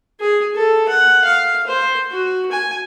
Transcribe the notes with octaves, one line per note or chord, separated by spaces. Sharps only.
G#4
A4
F#5
F5
C5
F#4
G#5